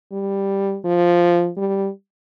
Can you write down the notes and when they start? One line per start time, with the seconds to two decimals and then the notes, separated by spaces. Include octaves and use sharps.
0.12 G3
0.85 F3
1.57 G3